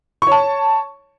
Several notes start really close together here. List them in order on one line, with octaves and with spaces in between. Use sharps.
C#6 C#5 A5